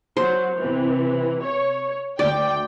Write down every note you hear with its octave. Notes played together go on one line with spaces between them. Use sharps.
F#3 C5
C3 E3
C#5
D2 D5 G5